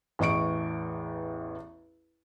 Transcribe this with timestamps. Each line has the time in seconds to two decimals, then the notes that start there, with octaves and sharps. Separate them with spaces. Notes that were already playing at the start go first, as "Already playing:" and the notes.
0.19 A1 E2 D#5 C#6 D7